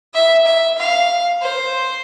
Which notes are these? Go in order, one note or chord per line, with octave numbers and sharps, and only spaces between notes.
E5
E5
F5
C5